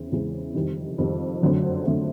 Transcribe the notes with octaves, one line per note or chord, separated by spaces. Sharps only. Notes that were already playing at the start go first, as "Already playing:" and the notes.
Already playing: E2 C#3 E3 C4
E2 C#3 E3 G#3 C4
F2 C3 D#3 G3
F2 C3 D#3 G3
F#2 D3 F#3 A3 C4
D3 F#3 A3 C4